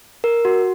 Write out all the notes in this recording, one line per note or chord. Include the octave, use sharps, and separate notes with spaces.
A#4
F#4